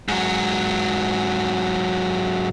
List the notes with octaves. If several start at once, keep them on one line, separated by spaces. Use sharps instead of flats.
G#2 F#3